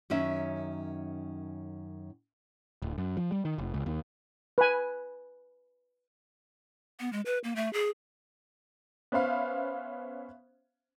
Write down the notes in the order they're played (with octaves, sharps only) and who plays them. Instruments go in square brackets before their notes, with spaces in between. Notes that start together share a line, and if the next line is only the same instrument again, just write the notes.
[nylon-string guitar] F#2 D#3 C#4 E5
[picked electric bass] D1
F#2
F3
G3
D#3
F1
C#2
D#2
[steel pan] B4 G#5
[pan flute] B3
G#3
B4
A#3
A3
G#4
[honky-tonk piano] B3 C#4 C5 E5 F5